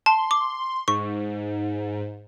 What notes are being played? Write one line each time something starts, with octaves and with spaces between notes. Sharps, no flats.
A5 C6
D6
G#2 C#6